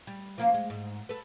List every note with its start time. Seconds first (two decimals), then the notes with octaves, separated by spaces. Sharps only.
0.07 G3
0.38 F3 A#3 C#4
0.54 G#3
0.70 G#2
1.09 A4 B4